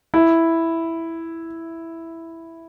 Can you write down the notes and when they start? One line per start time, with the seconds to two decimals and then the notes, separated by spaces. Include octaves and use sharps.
0.14 E4